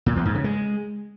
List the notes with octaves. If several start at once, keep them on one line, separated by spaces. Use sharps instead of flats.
A#2
E2
G#2
C#3
G#3